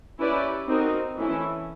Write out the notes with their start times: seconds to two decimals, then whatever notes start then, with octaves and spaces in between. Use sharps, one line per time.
0.19 C#4 E4 G4 B4 D5
0.68 C4 D#4 F#4 A#4
1.16 E3 A3 C#4 E4